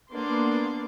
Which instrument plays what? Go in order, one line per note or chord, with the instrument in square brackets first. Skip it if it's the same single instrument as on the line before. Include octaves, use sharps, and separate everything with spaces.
[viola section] A#3 B3 D4 D5 C6